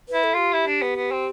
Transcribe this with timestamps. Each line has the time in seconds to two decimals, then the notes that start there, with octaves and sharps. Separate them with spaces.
0.08 E4 B4
0.24 A4
0.33 F4 G4
0.53 E4
0.67 D4
0.82 B3
0.96 B3
1.11 C4